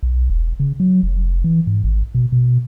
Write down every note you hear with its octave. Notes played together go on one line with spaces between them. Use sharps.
B1
E1
C#3
F#3
F1
E3
G#2
G#1
B2
B2